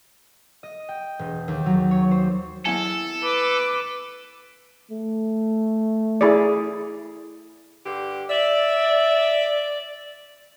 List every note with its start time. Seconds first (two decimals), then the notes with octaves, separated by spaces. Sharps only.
0.63 D#5
0.89 G5
1.19 E1
1.48 D#2
1.66 F#3
1.91 C#5
2.11 C5
2.65 B3 E4 A4 G#5
3.23 B4 D6
4.91 A3
6.21 E4 G#4 D5
7.84 G2 D3 G4
8.29 D5 E5